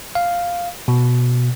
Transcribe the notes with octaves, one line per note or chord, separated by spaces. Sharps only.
F5
B2